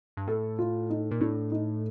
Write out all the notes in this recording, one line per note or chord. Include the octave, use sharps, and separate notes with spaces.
G2
A2 A4
F4
D#4
A#2
A2 D4
D#4